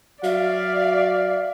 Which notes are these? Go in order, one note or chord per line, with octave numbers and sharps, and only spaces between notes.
F#3 D5 E5 F5